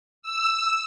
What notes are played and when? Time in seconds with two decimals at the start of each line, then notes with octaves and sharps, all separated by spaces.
0.22 E6